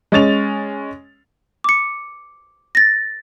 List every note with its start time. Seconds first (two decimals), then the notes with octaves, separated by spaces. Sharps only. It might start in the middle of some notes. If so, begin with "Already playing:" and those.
0.12 G#3 C#4 A6 F7
1.64 D6 C#7
2.75 A6 A#6